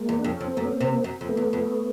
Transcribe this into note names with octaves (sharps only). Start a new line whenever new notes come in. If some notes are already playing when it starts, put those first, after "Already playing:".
Already playing: G#3 A#3
E2
D4
F2
C#4
F2
C4
F#2 A3 B3
C#4
A#3 C4
C3
A#3 C4
F#2
F2
A3 B3
E2
F2